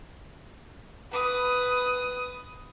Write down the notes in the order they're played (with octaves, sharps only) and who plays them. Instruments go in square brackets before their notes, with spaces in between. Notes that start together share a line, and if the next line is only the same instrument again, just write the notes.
[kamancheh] B4 D#6